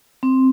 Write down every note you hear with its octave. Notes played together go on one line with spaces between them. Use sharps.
C4